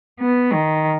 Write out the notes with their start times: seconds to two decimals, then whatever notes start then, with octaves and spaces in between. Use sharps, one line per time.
0.20 B3
0.53 D#3